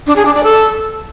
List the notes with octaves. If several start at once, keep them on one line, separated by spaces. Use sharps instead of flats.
D4
G#4
D4
D5
A4